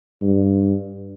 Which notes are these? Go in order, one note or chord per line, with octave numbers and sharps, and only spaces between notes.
G2